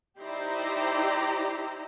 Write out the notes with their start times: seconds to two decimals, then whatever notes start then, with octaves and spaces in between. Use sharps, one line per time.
0.18 D#4 E4 G4 C5 D5 A#5